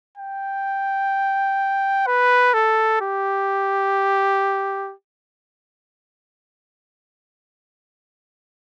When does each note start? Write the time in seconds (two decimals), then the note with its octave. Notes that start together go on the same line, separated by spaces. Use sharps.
0.17 G5
2.07 B4
2.54 A4
3.01 G4